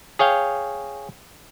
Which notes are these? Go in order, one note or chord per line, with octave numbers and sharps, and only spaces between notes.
G#4 C#5 F5 G5